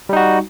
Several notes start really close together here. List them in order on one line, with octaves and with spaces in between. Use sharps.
G3 D#4 F#4